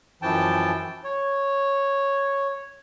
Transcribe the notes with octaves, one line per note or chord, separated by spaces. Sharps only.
F#2 E3 F3 G5 A5
C#5